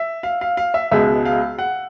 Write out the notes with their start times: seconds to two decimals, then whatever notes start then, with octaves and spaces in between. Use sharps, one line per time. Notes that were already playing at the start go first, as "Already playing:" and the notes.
Already playing: E5
0.23 F5
0.41 F5
0.57 F5
0.74 E5
0.92 C#2 B2 G#3 E5
1.25 F5
1.59 F#5